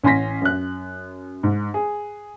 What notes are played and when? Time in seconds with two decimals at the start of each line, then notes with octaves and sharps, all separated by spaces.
0.04 A1 C#4 G#5 C6 A#6 B6
0.41 F#2 F#6
1.43 G#2
1.74 G#4